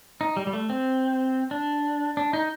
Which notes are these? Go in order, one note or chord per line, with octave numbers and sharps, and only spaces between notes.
D#4
G3
G3
A3
C4
D4
D4
D#4